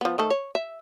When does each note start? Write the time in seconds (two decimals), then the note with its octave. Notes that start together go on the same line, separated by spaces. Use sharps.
0.01 F3 B3
0.18 D#3 A3 A4
0.30 C#5
0.55 E5